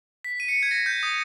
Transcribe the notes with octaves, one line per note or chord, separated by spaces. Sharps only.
B6
D#7
C#7
G#6
A#6
G6
D#6